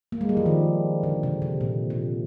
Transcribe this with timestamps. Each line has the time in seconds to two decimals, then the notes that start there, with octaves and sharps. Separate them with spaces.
0.12 A#3
0.21 G#3
0.29 G3
0.37 F3
0.46 D#3
1.03 D3
1.23 C3
1.42 C3
1.61 A#2
1.90 C3